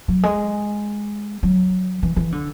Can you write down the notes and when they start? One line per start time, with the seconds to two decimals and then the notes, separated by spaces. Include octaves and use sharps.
0.08 F#3
0.23 G#3
1.43 F#3
2.03 E3
2.16 E3
2.32 D3